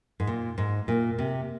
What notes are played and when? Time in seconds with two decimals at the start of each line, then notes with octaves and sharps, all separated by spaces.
0.20 G#2
0.27 A#2
0.58 G#2
0.88 A#2
1.18 C3